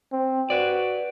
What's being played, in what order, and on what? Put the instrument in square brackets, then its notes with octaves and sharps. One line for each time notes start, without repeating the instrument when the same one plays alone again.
[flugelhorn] C4
[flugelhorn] F#4 [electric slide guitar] B4 D5